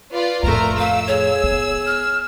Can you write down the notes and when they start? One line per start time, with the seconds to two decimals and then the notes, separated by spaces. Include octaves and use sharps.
0.12 F4 B4 D5
0.43 F2 A2 A3 F4 A#4 A#5
0.78 A3 F5 E6
1.08 G#4 C#5
1.44 B3
1.87 F6